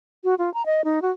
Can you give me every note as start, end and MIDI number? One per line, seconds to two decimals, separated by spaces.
0.24 0.35 66
0.39 0.52 65
0.54 0.65 82
0.66 0.82 75
0.85 1.02 63
1.02 1.11 66